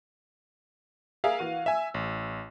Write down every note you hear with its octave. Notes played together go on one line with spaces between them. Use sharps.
G#4 A#4 E5 F5
E3 F#4 D#7
E5 G#5 E6
A1